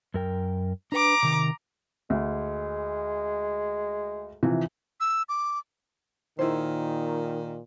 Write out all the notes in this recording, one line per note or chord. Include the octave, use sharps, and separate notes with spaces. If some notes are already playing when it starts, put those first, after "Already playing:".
F#2 A#4 G5
D4 B4 A#5 D6
C3 D#3
D2 G#3
C3 E3 F3
E6
D6
A#2 D#3 E4 G#4 C5